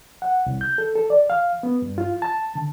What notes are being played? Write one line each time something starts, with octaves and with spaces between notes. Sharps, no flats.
F#5
C2
G6
A4
A4
D5
F5
B3
G2
F4
A5
D3